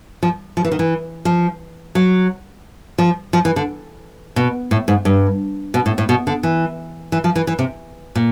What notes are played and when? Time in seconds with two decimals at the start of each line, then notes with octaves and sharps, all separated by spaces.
0.23 F3
0.57 F3
0.65 E3
0.72 D#3
0.79 E3
1.25 F3
1.95 F#3
2.98 F3
3.33 F3
3.45 E3
3.56 D3
4.36 B2
4.71 A2
4.88 G#2
5.05 G2
5.74 B2
5.86 A2
5.98 A2
6.09 B2
6.27 D3
6.43 E3
7.12 E3
7.24 F3
7.36 E3
7.47 E3
7.59 C3
8.15 A#2